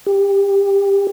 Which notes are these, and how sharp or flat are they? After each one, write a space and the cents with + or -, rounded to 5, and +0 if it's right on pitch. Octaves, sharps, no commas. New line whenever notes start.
G4 +20